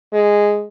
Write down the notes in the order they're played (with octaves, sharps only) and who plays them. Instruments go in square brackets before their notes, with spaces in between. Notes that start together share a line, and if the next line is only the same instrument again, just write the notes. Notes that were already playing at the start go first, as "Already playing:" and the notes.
[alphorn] G#3